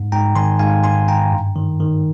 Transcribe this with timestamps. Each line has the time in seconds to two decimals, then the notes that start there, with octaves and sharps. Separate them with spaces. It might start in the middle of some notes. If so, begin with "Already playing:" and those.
Already playing: G#2
0.12 G#2 G5 A#5
0.35 D#3 G#5 C6
0.59 G#2 F5 G#5
0.83 G#2 G#5 C6
1.08 G#2 G5 A#5
1.32 G2
1.56 D#3
1.80 D#3